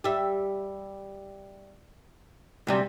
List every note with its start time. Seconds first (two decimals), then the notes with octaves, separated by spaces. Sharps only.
0.04 G3 E5
2.67 D2 C3 G3